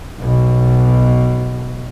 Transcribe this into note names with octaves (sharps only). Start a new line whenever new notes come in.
B1 B2